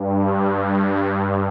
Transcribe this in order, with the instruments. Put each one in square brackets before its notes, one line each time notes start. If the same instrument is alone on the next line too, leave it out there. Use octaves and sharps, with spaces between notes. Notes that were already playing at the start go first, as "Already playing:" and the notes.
Already playing: [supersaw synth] G2
G2